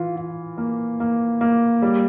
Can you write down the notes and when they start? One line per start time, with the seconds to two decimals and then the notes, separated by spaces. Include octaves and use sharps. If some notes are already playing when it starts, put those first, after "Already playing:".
Already playing: E3 F4
0.16 F4
0.58 A#3
1.00 A#3
1.41 A#3
1.82 G3